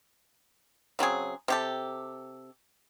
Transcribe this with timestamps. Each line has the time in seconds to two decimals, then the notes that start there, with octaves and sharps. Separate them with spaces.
0.99 C#3 F#3 C4 G#4
1.48 C3 G4 A4